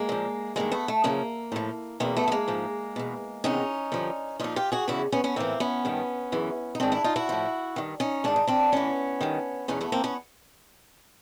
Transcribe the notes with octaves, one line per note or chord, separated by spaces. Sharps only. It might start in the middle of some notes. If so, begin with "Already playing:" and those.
Already playing: G#3 A#3
A#2 F3
G2 D#3 G#3 A#3
A3 B3
A3
F#2 C#3 F3 G#3 A#3
A2 F3
E2 B2 A#3 C4
A3 B3
A3
G#3 A#3
G#2 F3
E2 B2
E2 C3 D#3 C#4 D#4
G2 D3 F3
A#2 F3 D#4 F4
F4 G4
F#4 G#4
E2 C#3 F3 E4 F#4
B3 C#4
B3 C#4
A2 E3 A#3 C4
B3 C#4
G2 D#3
F#2 C#3 E3
D#4
G#2 D#3 C4 D4
D4 E4
D#4 F4
E4 F#4
A2 F3
G2 D#3
C#4 D#4
G#2 D#3 D4
D#4
C4 D4
A2 E3 B3 C#4
G2 D#3
E2 B2 C#4 D#4
A3 B3
A#3 C4
B3 C#4